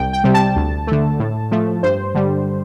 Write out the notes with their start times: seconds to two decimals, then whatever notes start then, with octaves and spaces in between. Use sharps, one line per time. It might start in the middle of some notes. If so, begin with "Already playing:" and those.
Already playing: C2 G5
0.13 G5
0.24 C3 G3
0.34 A5
0.56 D2
0.87 D3 A3
1.19 A2
1.51 F3 A3
1.83 G2 C5
2.15 D3 G3